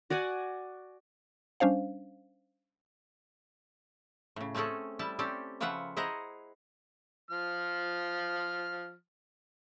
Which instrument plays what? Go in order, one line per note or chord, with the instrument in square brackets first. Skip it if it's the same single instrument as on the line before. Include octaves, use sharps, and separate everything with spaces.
[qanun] F#4 D5 F#5 G#5
[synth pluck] G3 C#4 D4 C5 F5
[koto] A2 C#3
A3 C4 C#4 G#4 A4
G3 E4 A5
C4 C#4 G4 A4 D5
C#3 F3 F4 B4 E5 F#5
E4 G#4 C5 D#5 F#5 A#5
[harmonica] F3 F6